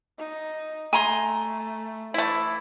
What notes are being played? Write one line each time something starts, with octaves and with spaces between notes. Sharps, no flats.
D#4
A3 G#5 A#5 C6
E3 A3 E4